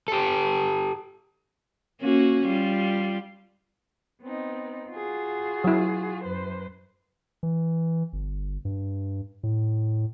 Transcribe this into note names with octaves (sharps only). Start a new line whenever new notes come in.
G4 A4
A#3 C#4 F#4
G3 F4
B3 C4 D#4
F4 F#4 G#4
F#3 E4
F#2 B4 C5
E3
G1
G2
A2